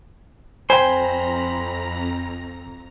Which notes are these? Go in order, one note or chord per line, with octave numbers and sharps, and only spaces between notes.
F2 C5 G5 G#5 A#5 B5